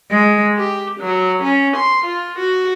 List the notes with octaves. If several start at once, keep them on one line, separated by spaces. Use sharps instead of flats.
G#3
G4
F#3
C#4
C6
F4
F#4